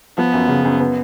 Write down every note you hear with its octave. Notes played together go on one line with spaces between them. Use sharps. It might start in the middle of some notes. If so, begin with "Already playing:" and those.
F3 B3
F#2
C#3
F#2
B3